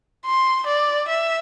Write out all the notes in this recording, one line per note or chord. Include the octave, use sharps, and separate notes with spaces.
C6
D5
E5